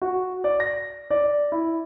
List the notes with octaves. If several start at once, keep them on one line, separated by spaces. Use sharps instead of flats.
F#4
D5
A#6
D5
E4